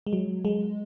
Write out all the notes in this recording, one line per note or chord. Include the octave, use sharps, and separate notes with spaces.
G#3
F#3
G#3